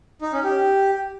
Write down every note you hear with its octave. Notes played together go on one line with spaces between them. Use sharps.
D#4
C#4
G4